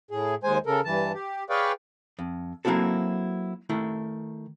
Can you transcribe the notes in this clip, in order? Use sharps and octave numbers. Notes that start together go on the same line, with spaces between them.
A2 G#4
D#2 G#3 C5 G#5
C#3 A4 A#4
G2 E3 A5
G4
G#4 B4 C#5 D5 F5 G5
F2
F#3 A#3 C4 E4 F#4 A4
D#3 A3 E4